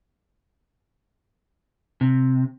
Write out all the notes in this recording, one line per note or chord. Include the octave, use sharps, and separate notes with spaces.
C3